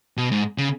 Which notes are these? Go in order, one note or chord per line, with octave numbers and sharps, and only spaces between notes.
B2
G#2
C#3